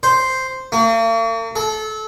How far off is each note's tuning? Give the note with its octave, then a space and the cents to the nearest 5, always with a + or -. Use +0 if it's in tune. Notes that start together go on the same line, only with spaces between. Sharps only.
C5 -5
A#3 -45
A4 -25